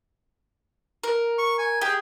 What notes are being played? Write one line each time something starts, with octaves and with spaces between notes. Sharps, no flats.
A#4
C#6
G#5
G4 G#4